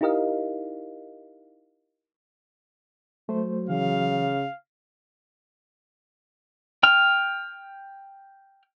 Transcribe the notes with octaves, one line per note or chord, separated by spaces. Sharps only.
D#4 E4 G4 A#4 D#5 F5
F#3 A3 C5
C#3 E3 F5
G5 F6